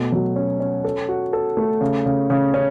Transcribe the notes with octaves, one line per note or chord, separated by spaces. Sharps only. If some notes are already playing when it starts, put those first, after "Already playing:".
Already playing: B2 A3
F#3
C#4
C#4
A4
F#4
A4
A3
C#3
C#3
C#3
C#4